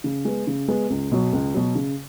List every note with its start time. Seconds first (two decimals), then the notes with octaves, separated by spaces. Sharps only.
0.04 C#3
0.25 G#3 B3
0.47 C#3
0.68 G#3 B3
0.90 C#2
1.12 B2 F#3
1.33 C#2
1.54 B2 F#3
1.75 C#3